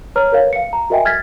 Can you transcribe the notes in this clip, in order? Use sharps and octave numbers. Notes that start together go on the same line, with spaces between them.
B4 C#5 A#5 F6
A#4 B4 C#5 F5
F5 C#7
A#5
F#4 A#4 D#5 E5 G5 G#5
F6 G#6 A6 B6